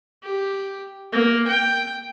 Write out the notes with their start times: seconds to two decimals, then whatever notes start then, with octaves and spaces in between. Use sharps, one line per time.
0.23 G4
1.13 A#3
1.48 G5